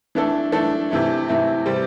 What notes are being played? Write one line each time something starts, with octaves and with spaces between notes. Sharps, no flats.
E3 A3 D4 A4
E3 A3 D4 A4
C3 E3 A3 E4
C3 E3 A3 E4
C3 G3 C4